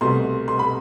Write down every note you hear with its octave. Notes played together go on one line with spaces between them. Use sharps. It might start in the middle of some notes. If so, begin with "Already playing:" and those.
C2 B2 A3 C6
C6
B5